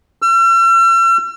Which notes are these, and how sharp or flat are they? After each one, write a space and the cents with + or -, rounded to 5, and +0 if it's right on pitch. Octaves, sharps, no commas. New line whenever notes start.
E6 +45